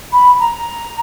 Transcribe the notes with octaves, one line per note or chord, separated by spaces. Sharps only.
B5
A#5